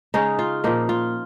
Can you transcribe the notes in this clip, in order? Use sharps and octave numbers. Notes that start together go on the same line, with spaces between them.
C#3 G#3 C#4 D#4
F4
A#2 F3 A#3 D#4
F4